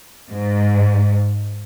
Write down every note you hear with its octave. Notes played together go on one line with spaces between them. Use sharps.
G#2